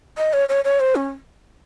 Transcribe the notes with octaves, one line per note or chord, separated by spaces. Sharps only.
D#5
C#5
C#5
C#5
C5
C#4